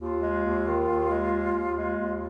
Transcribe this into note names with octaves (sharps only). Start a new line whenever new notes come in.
D#2 F4
G#3
D#2
D#3
D#2
G#3
D#2
D#2
G#3
D#2